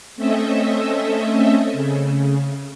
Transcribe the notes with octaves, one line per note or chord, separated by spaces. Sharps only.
A3 C4 C#4 A4 D#5 E5
C#3